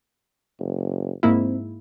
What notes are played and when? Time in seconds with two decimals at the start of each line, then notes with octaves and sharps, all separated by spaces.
0.59 F#1
1.23 G#2 A#3 C4 E4